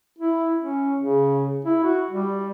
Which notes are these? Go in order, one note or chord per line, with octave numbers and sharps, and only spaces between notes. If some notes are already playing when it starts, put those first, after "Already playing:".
E4
C#4
C#3
E4
F#4
G3